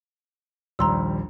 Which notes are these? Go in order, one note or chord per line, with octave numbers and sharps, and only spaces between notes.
A#1 D#2 G3 A#5 C6 E6